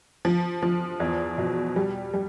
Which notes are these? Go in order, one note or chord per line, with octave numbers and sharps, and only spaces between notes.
F3
F3
E2
B2
G3
G3